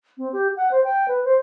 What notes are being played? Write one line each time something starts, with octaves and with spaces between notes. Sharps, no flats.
C4
G4
F#5
C5
G5
B4
C5